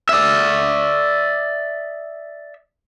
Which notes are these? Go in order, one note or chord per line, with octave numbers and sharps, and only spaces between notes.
D5 E5